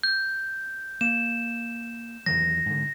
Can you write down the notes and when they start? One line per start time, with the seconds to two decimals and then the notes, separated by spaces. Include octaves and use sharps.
0.03 G6
1.01 A#3 E7
2.26 E2 D#3 F#3 A#6
2.66 G#2 D3